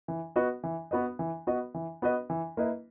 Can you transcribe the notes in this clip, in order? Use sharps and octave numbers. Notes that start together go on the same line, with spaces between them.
E3
B3 F#4 B4 D#5
E3
B3 F#4 B4 D#5
E3
B3 F#4 B4 D#5
E3
B3 F#4 B4 D#5
E3
A#3 E4 B4 D#5